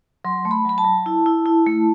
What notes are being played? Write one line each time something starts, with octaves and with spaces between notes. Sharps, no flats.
F#3 C6
A3
B5
F#3 B5
A5
F#3
E4
E4
E4
A3